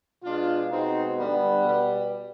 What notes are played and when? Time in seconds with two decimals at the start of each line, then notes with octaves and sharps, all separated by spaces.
0.23 B2 G#3 D4 F4
0.70 B2 G#3 C4 D#4
1.17 G2 D3 G3 B3
1.64 B2 G3